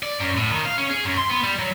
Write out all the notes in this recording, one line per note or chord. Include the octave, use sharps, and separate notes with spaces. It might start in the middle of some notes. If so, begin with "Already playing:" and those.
D5
F#2
A2
D#3
F5
C#4
G#4
F#2
C6
B3
G3
F#3